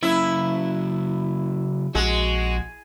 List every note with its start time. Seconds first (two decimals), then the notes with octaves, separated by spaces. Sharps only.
0.03 C#3 F#3 E4
1.95 A#1 G#3 F#4